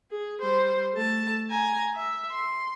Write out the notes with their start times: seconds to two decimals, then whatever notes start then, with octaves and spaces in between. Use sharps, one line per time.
0.11 G#4
0.40 G3 C5
0.93 A3 A5
1.50 G#5 A#5
1.95 E5
2.32 C6